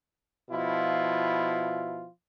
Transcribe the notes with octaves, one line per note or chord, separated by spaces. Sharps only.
B2 F3 E4 F4